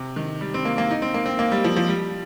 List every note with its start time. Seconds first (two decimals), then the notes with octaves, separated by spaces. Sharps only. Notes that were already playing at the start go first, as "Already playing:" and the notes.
Already playing: C3
0.16 D#3
0.41 G3
0.54 C4
0.65 A#3
0.78 A#3
0.91 D#4
1.02 C4
1.14 A#3
1.26 C4
1.39 A#3
1.51 G3
1.64 F3
1.76 F3
1.89 G3